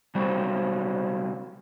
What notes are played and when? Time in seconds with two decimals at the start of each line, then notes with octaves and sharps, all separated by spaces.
0.15 C3 F#3 G3